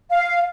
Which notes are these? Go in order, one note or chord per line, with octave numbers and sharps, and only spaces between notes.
F5